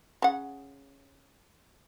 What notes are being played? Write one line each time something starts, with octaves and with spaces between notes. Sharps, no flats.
C#3 F#5